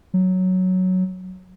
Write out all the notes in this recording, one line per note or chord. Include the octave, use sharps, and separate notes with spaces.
F#3